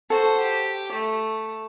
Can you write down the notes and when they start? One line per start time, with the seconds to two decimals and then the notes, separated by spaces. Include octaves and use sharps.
0.10 F#4 A4 C5
0.42 G4
0.93 A3